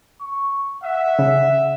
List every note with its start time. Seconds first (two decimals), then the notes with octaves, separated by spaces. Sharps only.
0.20 C#6
0.83 E5 F#5
1.19 C#3